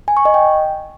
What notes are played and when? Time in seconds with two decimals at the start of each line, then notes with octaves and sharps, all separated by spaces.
0.08 G#5
0.17 C#6
0.25 D#5
0.34 G5